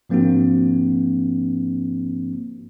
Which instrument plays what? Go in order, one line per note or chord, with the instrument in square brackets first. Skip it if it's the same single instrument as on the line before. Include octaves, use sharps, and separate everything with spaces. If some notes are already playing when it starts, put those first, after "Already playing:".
[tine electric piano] G#2 F3 A#3 C4 D4 F#4